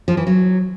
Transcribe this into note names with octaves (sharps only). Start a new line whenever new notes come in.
F3
E3
F#3